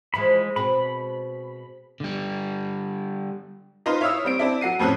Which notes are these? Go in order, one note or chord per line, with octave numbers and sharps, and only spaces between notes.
E3 F3 G#3 E4 B5
B2 G#3 C4 B5
D3 G3
D#4 F4 B4 C5
E4 C#5 F5 D#6 E6
G3 C4 D7
C4 D4 E4
F#3 F#5 C7 D#7
F2 A2 C4 C#4 B5 F#6